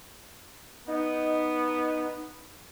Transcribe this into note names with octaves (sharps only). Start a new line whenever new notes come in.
B3 D#4